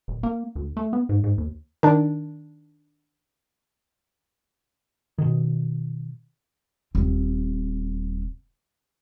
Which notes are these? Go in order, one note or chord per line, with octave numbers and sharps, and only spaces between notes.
D#1
A#3
D2
A3
B3
G#2
G#2
D#2
D#3 D4
B2 D#3
D#1 C4